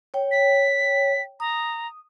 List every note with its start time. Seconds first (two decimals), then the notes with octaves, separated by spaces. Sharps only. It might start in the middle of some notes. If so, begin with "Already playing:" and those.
0.14 C#5 G5
0.31 B6
1.40 A#5 D#6